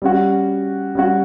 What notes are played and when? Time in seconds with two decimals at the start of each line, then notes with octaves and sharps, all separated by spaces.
0.02 G3 C#4 F#4
0.95 G3 C#4 F#4